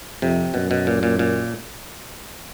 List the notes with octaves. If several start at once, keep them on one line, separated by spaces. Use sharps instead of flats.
F2 C3
F#2 B2
B2
A#2
A#2
A#2